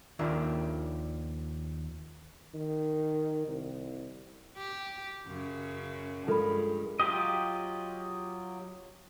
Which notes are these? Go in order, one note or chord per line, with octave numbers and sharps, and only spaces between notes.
D#2 D#3 F3 A#3 D4 E5
D#3
C2
G4
F#2 C#3
G2 G#3 F4 A4 A#4 B5
F#3 F4 G4 D#5